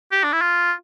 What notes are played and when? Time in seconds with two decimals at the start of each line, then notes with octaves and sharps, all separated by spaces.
0.12 G4
0.24 D4
0.33 E4
0.42 F4